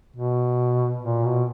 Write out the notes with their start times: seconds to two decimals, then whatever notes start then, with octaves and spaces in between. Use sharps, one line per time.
0.16 B2
1.02 A#2
1.25 B2